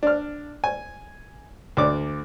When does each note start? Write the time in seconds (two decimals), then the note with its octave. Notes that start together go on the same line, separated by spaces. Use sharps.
0.03 D4 F6
0.64 G#5
1.77 D2 D4 D6